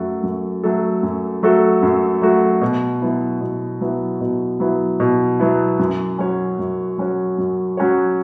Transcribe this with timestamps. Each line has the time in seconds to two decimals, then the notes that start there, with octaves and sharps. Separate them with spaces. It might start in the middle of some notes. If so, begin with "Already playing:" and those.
Already playing: F#2 F#3 A3 F#4 A4
0.23 F#2
0.64 F#3 A3 F#4 A4
1.03 F#2
1.43 F#3 A3 F#4 A4
1.82 F#2
2.22 F#3 A3 F#4 A4
2.61 B2
3.02 F#3 B3 E4
3.41 B2
3.81 F#3 B3 E4
4.21 B2
4.60 F#3 B3 E4
5.00 B2
5.40 F#3 B3 E4
5.79 F#2
6.19 F#3 C#4 F#4 C#5
6.59 F#2
6.98 F#3 C#4 F#4 C#5
7.38 F#2
7.77 F#3 C#4 F#4 C#5